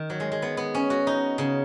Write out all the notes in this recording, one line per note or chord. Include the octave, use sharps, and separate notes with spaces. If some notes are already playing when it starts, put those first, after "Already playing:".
Already playing: D#3
F#3
G#3
G#3
B3
B3
C#4
F#4
D#4
C#3